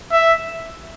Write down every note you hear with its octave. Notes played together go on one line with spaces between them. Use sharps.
E5